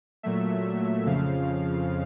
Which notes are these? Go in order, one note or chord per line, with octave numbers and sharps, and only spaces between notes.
A#2 F#3 A3 E5
F2 C#3 F3 F5